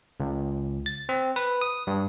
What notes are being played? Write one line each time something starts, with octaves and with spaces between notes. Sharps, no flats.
C#2
A6
C4
B4
D#6
G2